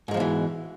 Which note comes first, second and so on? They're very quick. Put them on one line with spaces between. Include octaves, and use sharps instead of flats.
G#2 G#3 F3 B2 E3